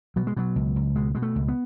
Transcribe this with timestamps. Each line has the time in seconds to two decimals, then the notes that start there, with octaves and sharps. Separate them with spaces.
0.16 B2 F#3
0.27 G#3
0.36 B2 F#3
0.56 C#2
0.76 C#2
0.95 B2 G#3
1.15 B2 G#3
1.22 A3
1.35 C#2
1.48 B3